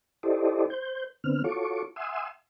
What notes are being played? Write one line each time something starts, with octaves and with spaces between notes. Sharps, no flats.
E4 G4 A4 C5 D5 D#5
C5 G6
D3 B3 C4 F6
F4 F#4 A4 C#5 C#6 D6
E5 F#5 G#5 C6 D#6 E6